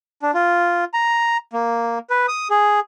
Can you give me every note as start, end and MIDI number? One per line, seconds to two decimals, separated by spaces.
0.22 0.31 62
0.34 0.84 65
0.94 1.37 82
1.53 1.99 58
2.10 2.26 71
2.28 2.48 87
2.50 2.80 68